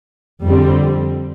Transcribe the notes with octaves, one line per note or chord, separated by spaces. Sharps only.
F2 D3 G3 C4